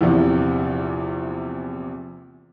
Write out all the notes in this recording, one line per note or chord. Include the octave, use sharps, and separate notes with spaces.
A#1 E2 C3